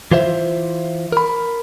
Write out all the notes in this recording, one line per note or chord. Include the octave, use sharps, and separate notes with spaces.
E3 F4 C5 E5
A#4 B5